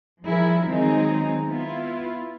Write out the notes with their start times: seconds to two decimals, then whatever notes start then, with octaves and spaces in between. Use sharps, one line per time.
0.24 F3 G3 E4 G#4 A#4
0.66 D#3 F#3 G#3 C4 D#4 G#4
1.47 B3 E4 F4